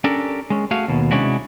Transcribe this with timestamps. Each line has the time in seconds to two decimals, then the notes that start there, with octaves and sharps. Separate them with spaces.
0.04 C#4 D4 G4 A4 A#4
0.50 G#3 C#4
0.71 A3 F#4 G#4 F5
0.88 D#2 B2
1.11 C3 G#3 C#4 D4 E4 F#4